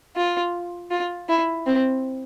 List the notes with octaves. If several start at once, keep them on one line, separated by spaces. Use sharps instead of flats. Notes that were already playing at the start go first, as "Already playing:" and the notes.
F4
F4
E4
C4